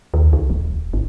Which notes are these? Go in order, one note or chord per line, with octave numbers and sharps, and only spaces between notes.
D#2
C#2
D#1
G#1